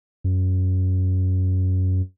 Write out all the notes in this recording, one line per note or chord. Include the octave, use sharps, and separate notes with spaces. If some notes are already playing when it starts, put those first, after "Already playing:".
F#2